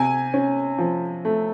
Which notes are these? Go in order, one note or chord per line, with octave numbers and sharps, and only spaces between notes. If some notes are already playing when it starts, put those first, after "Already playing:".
Already playing: C3 G#5
C#4
F3
A3